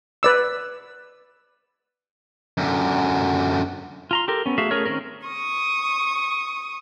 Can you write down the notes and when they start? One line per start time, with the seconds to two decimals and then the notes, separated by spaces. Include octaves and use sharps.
0.23 B4 D5 E6
2.58 F#2 D3
4.11 F4 A#5 C6
4.28 G4 A4 A#4
4.46 B3 C#4
4.58 A3 F#4 G#4 E5 F5
4.71 A3 C#4 G#4 A#4 C#5
4.85 D#3 G3 C4 C#4 A#4
5.27 C#6 D#6